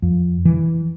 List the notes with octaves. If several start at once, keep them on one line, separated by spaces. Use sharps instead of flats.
F2
E3